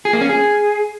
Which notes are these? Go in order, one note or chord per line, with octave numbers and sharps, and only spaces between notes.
G#4
A#3
C#4
G#4